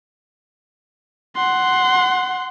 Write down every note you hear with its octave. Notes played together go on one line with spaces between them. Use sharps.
F#5 C6